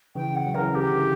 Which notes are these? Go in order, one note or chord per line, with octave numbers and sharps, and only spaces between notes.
C#3 E3 G5
F#5
F#3
C#3 E3 A#4
G4
D3
C#3 E3